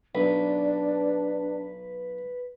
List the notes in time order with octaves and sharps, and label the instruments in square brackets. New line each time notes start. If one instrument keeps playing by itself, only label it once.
[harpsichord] B1 [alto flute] D4 [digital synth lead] B4